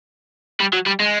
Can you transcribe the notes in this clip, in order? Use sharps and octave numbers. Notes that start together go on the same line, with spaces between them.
G3
F#3
G3
G#3